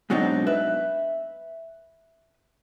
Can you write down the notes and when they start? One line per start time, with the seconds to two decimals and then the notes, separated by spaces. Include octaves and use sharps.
0.10 G#2 B2 F#3 C4 D4 D#4
0.46 B4 E5